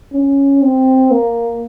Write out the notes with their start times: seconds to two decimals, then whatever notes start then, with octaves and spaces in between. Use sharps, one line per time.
0.13 C#4
0.62 C4
1.11 A#3